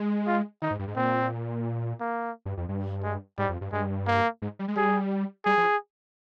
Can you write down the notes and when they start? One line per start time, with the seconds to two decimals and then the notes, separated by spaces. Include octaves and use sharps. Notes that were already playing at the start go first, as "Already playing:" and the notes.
Already playing: G#3
0.27 F4
0.62 D#3 D#4
0.71 G#2
0.79 G2
0.88 G#2
0.96 A#2 C4
2.00 A#3
2.45 G2
2.57 F2
2.69 G2
3.03 G#3
3.38 G#2 G3
3.49 F2
3.61 G2
3.72 G2 G#3
4.07 A#3
4.42 G#2
4.59 G3
4.68 G#3
4.76 G3 G#4
5.45 G3 G#4
5.58 F3